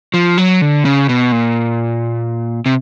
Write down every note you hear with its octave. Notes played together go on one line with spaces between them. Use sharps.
F3
F#3
D3
C#3
B2
A#2
C3